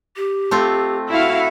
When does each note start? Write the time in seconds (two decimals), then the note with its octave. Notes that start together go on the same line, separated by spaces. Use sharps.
0.16 G4
0.51 A3 C4 F4
1.09 E4 F#4 E5 F5